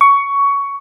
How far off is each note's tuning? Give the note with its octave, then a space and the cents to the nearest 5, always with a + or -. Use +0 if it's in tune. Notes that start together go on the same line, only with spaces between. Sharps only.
C#6 +15